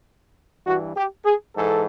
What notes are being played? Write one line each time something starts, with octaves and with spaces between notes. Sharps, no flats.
G2 E3 F#4
G4
G#4
G#2 E3 A4